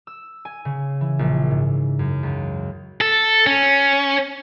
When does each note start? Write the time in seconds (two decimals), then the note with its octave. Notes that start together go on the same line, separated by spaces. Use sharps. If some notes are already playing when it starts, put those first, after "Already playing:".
0.07 E6
0.45 G#5
0.65 C#3
1.01 E3
1.19 A#1
1.51 G#2
1.99 F#2
2.23 C#2
3.01 A4
3.46 C#4